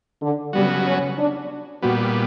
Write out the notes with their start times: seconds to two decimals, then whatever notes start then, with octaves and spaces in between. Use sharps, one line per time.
0.22 D3
0.53 C#3 F#3 G3 B3 F#4
0.86 C#4
1.18 D4
1.82 A#2 G3 B3 F#4